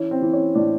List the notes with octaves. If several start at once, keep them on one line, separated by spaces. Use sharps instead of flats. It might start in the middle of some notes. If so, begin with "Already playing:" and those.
Already playing: E3 C#4
C4
E3
C#4
A2 D4